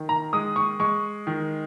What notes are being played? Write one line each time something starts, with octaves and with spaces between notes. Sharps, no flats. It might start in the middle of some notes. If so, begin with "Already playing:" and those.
Already playing: D#3
A#5
G#3 D#6
C#6
G#3 C#6
D#3